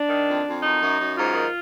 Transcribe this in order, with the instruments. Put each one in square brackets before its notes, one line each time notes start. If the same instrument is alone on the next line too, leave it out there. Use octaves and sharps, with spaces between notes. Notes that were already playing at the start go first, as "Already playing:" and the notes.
Already playing: [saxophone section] D4
D#3
F2
F2
F#2 D#4
F#2
F#2
G#2 F4
D#3